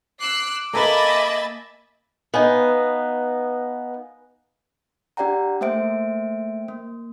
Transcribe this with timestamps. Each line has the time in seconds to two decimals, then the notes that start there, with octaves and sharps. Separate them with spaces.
0.21 D6 E6 F#6 C7
0.73 A#3 A4 B4 D#5 E5 G#5 B5 A6
2.34 B3 D#4 B4 F5 G#5
5.17 D4 G4 D5 F#5 G5 A#5
5.61 A3 A#3 C5 E5 G5 D7
6.68 A#3